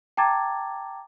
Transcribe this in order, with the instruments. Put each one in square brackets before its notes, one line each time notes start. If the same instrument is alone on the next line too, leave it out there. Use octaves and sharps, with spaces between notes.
[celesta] G5 A5 A#5 D6 G#6 A6